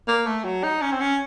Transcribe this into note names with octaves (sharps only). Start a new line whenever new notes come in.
A#3
A3
F#3
D#4
C#4
C4
C#4